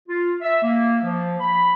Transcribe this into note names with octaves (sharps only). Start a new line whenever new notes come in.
F4
E5
A#3
F3
B5